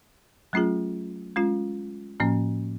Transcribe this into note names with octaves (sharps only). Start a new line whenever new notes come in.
F#3 A3 C#4 F4 G#4
G#3 C#4 F4
A2 F3 A#3 C#4